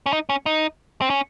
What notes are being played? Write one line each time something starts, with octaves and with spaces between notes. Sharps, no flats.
C#4
D#4
C#4
D#4
C4
C#4